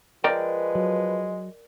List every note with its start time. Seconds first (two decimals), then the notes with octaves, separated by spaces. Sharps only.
0.24 F3 G#3 A#4 B4 D5 G5
0.75 F#3